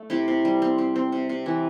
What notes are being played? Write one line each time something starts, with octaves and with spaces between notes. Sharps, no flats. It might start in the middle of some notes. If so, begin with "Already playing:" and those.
Already playing: A3
C3 E4 G4
C3
G3
C4
C4
C4
C3
C3
E3 E4